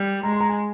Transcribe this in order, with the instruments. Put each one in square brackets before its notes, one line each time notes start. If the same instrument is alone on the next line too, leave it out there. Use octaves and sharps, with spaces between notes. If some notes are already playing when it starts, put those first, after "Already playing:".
Already playing: [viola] G3
[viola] G#3 [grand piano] A#5
[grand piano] C6
A#5
G#5